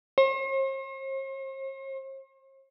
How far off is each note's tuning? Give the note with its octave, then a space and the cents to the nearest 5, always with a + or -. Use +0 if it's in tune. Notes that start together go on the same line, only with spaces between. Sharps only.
C5 +45